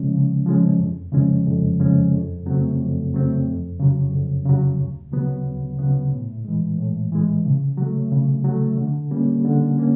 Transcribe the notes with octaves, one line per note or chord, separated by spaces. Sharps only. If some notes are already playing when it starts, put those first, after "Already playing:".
Already playing: C#3 F3 G#3 C#4
C#3
F3 G#3 C#4
F2
C#3 F3 G#3 C#4
F2
C#3 F3 G#3 C#4
F2
C#3 F#3 A3 C4
F2
C#3 F#3 A3 C4
F2
C#3 F#3
F2
C#3 F#3
D2
C#3 F#3 B3
D2
C#3 F#3 B3
A2
E3 G#3
A2
E3 G#3
C#3
F#3 A3
C#3
F#3 A3
D3
G3 A#3 C#4
D3
A#3 C#4